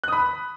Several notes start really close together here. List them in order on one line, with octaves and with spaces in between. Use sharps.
F#6 D#6 B5